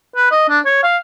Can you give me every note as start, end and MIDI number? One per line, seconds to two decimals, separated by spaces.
0.16 0.27 71
0.31 0.48 75
0.49 0.59 62
0.65 0.82 73
0.83 0.97 77